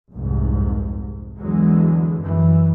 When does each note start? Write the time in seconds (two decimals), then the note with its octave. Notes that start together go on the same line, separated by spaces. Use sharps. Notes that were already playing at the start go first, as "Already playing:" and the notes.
0.12 F1 C2 G#2
1.40 E2 D3 E3 F#3 G#3
2.18 F#2 E3